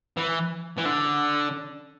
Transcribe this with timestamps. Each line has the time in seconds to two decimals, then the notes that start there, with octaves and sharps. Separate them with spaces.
0.17 E3
0.78 E3
0.85 D3